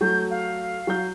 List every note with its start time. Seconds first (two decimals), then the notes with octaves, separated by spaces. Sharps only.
0.01 F#3 A3 G6
0.30 F5
0.87 F#3 G6